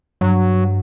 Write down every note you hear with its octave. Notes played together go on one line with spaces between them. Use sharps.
G2 F#3